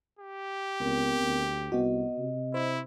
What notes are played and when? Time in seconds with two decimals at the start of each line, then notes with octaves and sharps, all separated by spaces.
0.19 G4
0.80 C#2 B3 C4 A#4
1.20 D2
1.72 C2 B3 F#4 D#5
2.18 C3
2.54 E4 C5